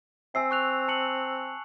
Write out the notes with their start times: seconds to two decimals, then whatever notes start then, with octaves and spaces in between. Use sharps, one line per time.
0.35 C4 G#5 E6 C7
0.51 C#6 F#6 F7
0.88 A5 C#7 F#7